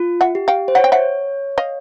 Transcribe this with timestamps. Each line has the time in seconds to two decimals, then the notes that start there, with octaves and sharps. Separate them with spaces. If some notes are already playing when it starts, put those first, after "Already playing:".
Already playing: F4
0.21 E5 F#5
0.35 G4
0.48 F5 G5
0.68 C5
0.75 C#5 F#5
0.84 G5
0.92 E5 F#5
1.58 D#5 F5